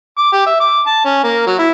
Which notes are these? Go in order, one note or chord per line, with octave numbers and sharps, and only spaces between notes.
D6
G4
E5
D6
A5
C#4
A#3
F#3
E4